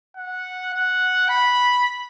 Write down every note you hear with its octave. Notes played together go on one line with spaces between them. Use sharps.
F#5
F#5
B5